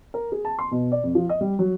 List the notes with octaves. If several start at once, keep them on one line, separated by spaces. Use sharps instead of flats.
A#4
G#4
A5
C6
B2
D5
F2
F3
D#5
G3
F#3